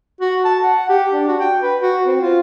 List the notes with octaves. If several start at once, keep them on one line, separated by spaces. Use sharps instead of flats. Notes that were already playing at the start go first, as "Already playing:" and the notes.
F#4
A5
F#5
G4
D4
F#4
G5
B4
F#4
C4
F4